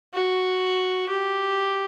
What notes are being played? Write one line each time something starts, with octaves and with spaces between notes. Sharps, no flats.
F#4
G4